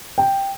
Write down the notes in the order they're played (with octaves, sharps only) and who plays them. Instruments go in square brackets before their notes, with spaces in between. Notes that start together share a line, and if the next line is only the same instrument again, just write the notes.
[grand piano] G5